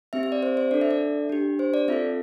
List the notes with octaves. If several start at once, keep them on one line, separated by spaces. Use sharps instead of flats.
C4 G4 E5
E5
D5
C5
C5
D4 A4 D5
E5
D5
D4 G4
C5
D5
C4 F4 A4 E5